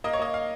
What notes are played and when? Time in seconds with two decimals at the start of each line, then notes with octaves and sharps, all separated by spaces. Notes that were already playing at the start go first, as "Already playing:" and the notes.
0.04 A#3 D#5
0.13 C#5
0.19 A#3 D#5
0.34 F5